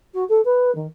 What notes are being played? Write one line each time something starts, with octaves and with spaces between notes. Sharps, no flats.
F#4
A4
B4
D#3